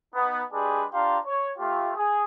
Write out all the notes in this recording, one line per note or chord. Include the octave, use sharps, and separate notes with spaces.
B3 D#4
G#3 D4 G4 G#4 B4 D5
D4 F4 G4 F5 A#5 C6
C#5
A3 F4 G4
G#4